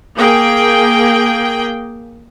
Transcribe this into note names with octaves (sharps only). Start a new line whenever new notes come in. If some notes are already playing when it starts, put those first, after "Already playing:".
A#3 G#4 G5